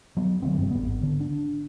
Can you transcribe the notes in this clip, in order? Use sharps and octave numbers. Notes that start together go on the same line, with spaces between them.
F#3 B3
D3 F#3 C4
F1 G2
G#1 B3
D3
D4